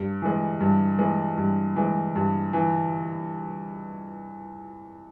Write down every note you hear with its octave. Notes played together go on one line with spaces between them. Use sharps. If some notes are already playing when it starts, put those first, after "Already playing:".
Already playing: G2
E3 G#3
G2
E3 G#3
G2
E3 G#3
G2
E3